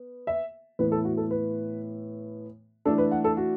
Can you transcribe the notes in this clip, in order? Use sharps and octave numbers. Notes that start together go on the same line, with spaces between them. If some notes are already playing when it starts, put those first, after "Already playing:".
Already playing: B3
E5
A2 E3 B3 B4
A4
F#4
A4
B4
E3 A3 D4 A4
B4
F#5
A4
F#4